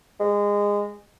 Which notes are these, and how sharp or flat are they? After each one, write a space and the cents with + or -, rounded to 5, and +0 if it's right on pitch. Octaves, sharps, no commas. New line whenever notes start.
G#3 -20